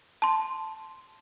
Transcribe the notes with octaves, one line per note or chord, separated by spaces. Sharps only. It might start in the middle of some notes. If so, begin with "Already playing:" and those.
A5 C6